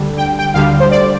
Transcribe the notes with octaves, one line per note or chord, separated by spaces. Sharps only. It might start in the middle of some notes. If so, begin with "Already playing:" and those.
Already playing: D2 D3 G3
G5
G5
D2 D3 G3 F5
C5
D5